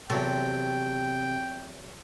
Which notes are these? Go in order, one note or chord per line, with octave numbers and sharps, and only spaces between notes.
E2 C3 F#3 A4 G5